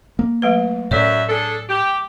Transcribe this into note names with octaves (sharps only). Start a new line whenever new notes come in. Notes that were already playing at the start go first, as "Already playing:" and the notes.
A#3
F#3 A3 B4
F#2 A2 C#5 D5 E5
D4 G#4 A4
G4